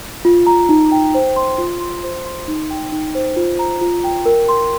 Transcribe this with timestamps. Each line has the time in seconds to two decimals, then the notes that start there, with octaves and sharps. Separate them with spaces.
0.25 F4
0.47 A#5
0.69 D#4
0.92 G5
1.14 C5
1.36 C6
1.58 F4
1.81 C6
2.03 C5
2.26 C6
2.48 D#4
2.70 G5
2.92 D#4
3.15 C5
3.36 F4
3.59 A#5
3.81 F4
4.04 G5
4.26 A#4
4.49 C6